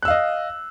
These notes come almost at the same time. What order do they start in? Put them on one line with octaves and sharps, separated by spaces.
F#6 E6 F5 D#5